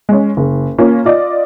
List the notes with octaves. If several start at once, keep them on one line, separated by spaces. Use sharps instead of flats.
G#3 C#4
F#1
A#3 C#4 F4
F4 D5 D#5